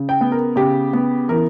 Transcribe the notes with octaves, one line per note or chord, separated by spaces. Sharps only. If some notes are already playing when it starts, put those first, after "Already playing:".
Already playing: C#3
G5
B3
A#4
C#3 G4
B3
E3 A#4